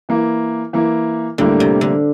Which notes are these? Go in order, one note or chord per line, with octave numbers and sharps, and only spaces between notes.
E3 A#3 E4
E3 A#3 E4
A2 D3 G3 A#3 E4
C3
D3